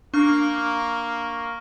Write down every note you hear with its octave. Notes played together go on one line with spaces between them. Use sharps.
A#3 D4 C#6 F6